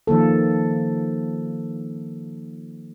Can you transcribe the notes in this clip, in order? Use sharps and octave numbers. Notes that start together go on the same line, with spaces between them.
D#3 F3 A#3 A4